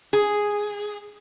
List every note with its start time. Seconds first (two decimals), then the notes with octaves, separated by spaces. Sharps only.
0.13 G#4